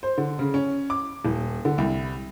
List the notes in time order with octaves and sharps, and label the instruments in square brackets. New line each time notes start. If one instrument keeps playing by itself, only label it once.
[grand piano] C5
D3
C#3
C#4
D6
D#1
D3
C2